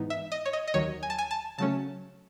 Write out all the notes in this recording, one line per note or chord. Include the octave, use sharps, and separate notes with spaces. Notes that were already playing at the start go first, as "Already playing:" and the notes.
Already playing: G#2 E3 B3 D#4
E5
D#5
C#5
D#5
D#5
D#2 D#3 F#3 C#5
G#5
A5
G#5
A5
C#3 F#3 A3 C#4 A5